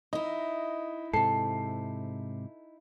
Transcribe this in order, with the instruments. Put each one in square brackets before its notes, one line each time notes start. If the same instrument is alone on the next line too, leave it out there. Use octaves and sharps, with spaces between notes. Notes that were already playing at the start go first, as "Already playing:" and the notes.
[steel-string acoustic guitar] D#4 E4 [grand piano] D#5
[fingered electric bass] G#2 C3 [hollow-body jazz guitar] A4 [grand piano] C7